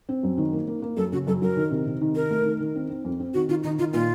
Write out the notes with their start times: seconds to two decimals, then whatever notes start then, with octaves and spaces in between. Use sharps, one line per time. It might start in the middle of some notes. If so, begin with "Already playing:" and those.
0.09 C4
0.23 F#2
0.38 D#3
0.53 A#3
0.68 A#3
0.82 A#3
0.97 F#2 A4
1.12 C#3 F#4
1.27 F#2 A4
1.42 F#3 A#4
1.56 D#3
1.71 C3
1.86 C3
2.01 D#3
2.15 D#4 A#4
2.30 A3
2.45 D#3
2.60 D#3
2.76 C4
2.90 C4
3.05 F2
3.20 C4
3.34 D#3 F#4
3.48 D#3 F4
3.63 D#3 D#4
3.78 D#3 F4
3.93 A#2 F4